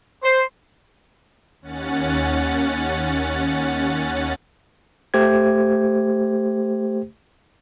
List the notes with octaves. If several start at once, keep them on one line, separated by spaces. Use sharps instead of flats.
C5
D#2 C#4 F#5 A6
A3 G4 C5 G#6